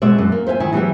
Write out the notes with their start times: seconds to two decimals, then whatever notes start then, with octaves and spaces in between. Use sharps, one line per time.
0.02 B2 G#3 D4 D5 E5
0.18 F#2
0.32 A#3
0.47 C5 E5 F5 G#5
0.60 D#3 E4 G#5
0.72 E3 F#3 B3 G4 G#4 E5